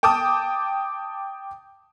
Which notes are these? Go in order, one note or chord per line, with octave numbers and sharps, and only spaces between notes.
G5 A5 D6 D#6